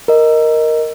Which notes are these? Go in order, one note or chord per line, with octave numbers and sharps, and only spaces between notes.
A#4 D#5